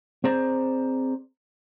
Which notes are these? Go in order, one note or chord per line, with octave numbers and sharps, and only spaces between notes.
C4 G#4 C5 D5 A#5